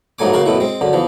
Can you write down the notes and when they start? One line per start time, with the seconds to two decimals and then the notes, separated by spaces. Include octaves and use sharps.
0.19 A#1 G#2 F#3 A3 G#5 D6
0.33 C#3 A#3 F#4 A#4
0.45 F#2 B2 A3 E4
0.60 G#3 C4
0.81 F#2 D3
0.93 E2 F3